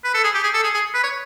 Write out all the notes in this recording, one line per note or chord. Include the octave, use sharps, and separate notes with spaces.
B4
A4
G#4
G4
G#4
A4
G#4
G#4
B4
C#5